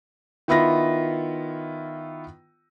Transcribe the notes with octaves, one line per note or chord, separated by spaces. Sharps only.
D#3 B3 E4 F4 A#6